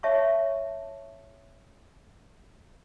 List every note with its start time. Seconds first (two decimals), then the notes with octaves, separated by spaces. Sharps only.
0.03 C#5 E5 F5 A5 C#6